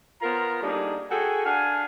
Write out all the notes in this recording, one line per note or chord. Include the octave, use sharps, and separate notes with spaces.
B3 F4 A#4 C5 A#5
G3 A#3 D4 D#4 G#4 A4
F#4 G#4 A4 G5 G#5
D4 F5 F#5 G#5